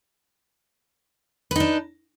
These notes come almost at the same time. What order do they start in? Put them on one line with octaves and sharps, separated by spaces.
B4 D#4 D4